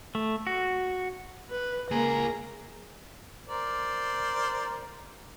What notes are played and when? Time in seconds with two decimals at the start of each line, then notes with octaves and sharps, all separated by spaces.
0.15 A3
0.47 F#4
1.50 B4
1.91 C#2 A#3 G#4 A#5
3.47 A#4 C5 D5